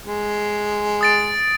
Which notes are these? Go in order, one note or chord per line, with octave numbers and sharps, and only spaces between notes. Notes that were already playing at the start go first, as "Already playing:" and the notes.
G#3
D#6 A6 D7